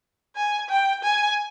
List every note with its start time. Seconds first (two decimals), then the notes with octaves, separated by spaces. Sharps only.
0.36 G#5
0.69 G5
1.03 G#5